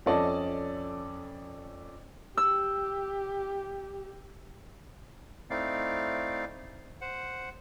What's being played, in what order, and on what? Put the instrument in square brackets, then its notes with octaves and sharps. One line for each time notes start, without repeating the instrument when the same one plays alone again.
[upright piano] F2 C#4 A4 D5 D#5 A5
[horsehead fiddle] G4 [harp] E6
[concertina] A3 C4 D#4 E4 D5 F5
C5 F#5